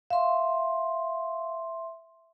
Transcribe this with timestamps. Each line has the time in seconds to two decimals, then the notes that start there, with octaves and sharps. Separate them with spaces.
0.10 E5 F5 C6